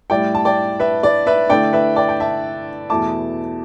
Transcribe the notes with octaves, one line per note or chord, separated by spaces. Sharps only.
A2 G3 E4 D5 G5
A5
D5 G5
B4 E5
D5
B4 E5
D3 A3 E4 D5 G5
B4 E5
D5 G5
G5
E5 A5
E2 B2 A3 E4 A5 D6